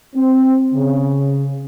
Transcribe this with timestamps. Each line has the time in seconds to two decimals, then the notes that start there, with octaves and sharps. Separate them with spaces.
0.16 C4
0.74 C#3